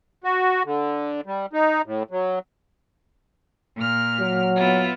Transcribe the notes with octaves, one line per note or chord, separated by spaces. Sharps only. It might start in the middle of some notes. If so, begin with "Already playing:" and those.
F#4
D3
G3
D#4
A2
F#3
A#2 F6
F#3
B3 E4 F4